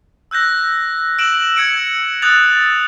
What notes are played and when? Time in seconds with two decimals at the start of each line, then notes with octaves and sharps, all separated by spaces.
0.31 E6 F#6 G6 A#6
1.18 E6 D7 E7 F#7
1.56 E6 G#6 C#7 D7
2.22 D#6 F#6 G6 A6 F7